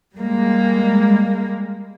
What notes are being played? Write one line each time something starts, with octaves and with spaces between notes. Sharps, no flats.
G3 G#3 A#3